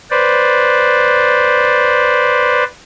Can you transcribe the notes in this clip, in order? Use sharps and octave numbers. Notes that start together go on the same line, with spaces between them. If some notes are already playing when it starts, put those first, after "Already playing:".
B4 C5 D5